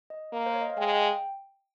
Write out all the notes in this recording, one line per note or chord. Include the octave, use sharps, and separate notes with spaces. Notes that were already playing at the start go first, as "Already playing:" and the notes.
D#5
A#3
C5
C#5
D#5
F5
G#3 G5
G5